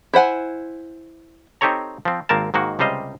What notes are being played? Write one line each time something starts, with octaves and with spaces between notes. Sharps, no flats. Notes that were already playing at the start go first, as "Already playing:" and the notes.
E4 C5 F#5 G#5
C4 D#4 G4 A4 C#5 A#5
F3 C4
G#1 A#3 C4 A#4 A5
G#2 D#3 A#3 F#4
C#2 C3 G3 C5 D#5 F5